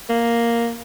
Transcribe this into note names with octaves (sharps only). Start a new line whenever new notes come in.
A#3